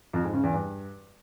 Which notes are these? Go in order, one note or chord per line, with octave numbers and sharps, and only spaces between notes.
F2
G#2
C#3
E2
G2